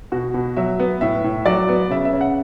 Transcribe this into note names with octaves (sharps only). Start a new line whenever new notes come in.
B2 F#4
B2
F#3 E5
B3
A2 E5
A2
F#3 D5
B3
C#3 E5
E5
C#3
F#5